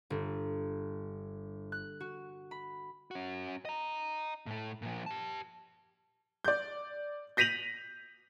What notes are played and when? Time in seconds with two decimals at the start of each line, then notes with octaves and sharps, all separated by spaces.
0.10 G1
1.72 F#6
2.00 F#4
2.51 B5
3.11 C#4 F#4
3.65 D#5 A#5
4.46 A2 A3
4.82 A#2 F3
5.06 G4 A5
6.45 D5 G6
7.37 G6 A#6 B6 D#7 F7 F#7